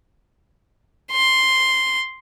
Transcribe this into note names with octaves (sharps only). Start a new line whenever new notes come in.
C6